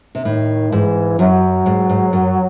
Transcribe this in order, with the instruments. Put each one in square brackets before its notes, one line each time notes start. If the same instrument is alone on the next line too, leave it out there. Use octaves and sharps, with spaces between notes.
[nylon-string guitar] C3
[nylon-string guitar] A2 [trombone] D#3
[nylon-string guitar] G#2 [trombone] E3
[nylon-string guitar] F#2 [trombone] F#3
[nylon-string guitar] G#2
G#2
F#2